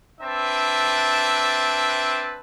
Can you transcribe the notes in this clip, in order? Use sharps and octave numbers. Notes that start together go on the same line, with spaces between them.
C4 D4 B4 E5 A5